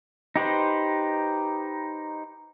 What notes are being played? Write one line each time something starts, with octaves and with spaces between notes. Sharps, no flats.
D#4 G4 B4 C5